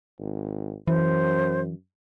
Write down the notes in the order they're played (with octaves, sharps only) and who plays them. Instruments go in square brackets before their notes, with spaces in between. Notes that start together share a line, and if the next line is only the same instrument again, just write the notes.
[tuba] G#1
[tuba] F#2 [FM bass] E3 [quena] C5